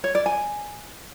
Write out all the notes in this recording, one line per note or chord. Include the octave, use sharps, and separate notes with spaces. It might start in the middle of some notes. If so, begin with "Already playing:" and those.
C#5
D5
G#5